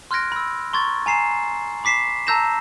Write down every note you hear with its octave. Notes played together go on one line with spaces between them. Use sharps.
C6 F6 F#6 G#6 A#6 D7
B5 E6
A#5 C6 C#6 G#6 A6
G#5 A#5 C7 E7
B5 D6 B6 C7 E7
A5 A#5 E6 G6 A#6 E7